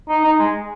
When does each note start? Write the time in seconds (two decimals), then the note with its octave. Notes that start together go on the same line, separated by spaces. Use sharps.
0.09 D#4
0.24 D#4
0.39 G#3